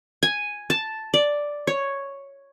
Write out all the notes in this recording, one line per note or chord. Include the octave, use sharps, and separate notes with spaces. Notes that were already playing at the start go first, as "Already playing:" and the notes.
G#5
A5
D5
C#5